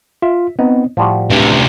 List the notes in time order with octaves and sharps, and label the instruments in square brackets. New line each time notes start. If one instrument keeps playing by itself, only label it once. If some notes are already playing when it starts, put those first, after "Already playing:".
[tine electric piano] F4 [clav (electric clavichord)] E5
[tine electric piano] B3 C4 [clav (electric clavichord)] D#4
[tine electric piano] A2 [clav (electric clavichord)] F3 G3 F#4
[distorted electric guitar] D2 C3 [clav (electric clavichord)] G2